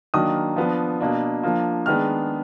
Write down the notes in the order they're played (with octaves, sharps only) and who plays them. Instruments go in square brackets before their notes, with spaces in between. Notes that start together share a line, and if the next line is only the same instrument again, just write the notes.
[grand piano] D#3 F#3 A#3 D4 D#6
F3 B3 D4
B2 A#3 D4
F3 A#3 D4
D#3 G#3 B3 D4 F6